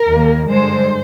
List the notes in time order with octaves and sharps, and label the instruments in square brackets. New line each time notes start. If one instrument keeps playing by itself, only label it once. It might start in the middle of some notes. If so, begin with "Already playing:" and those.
Already playing: [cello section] A#4
D#2 D#3 A#3
G2 D3 G#3 C5